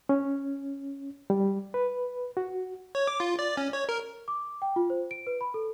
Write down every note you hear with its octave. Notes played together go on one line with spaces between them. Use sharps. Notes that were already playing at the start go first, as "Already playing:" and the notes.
C#4
G3
B4
F#4
C#5
D6
F4
D5
C#4
C#5
A#4
D6
G5
F4
C5
D7
B4
B5
A4